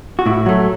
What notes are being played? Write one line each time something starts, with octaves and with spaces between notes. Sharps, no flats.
F#4
A2 E4
F#3 A3